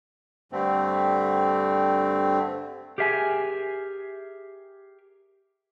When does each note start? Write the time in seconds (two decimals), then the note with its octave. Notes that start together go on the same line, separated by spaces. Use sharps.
0.52 G2 D3 A3 C4
2.98 G4 G#4 A#4 E5 G5 G#5